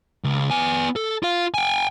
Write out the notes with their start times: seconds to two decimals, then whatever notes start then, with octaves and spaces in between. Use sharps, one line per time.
0.24 C#2
0.50 B3 G#5
0.96 A4
1.23 F4 F5
1.54 G5 G#5